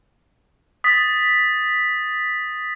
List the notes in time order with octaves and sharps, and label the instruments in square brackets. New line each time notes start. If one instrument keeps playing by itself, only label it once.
[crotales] D#6 A6 B6